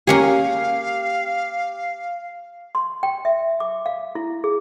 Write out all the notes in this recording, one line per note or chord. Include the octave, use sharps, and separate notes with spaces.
A#3 C#4 G4 G#4 F5
C6
G5
E5
D6
F5
E4
G#4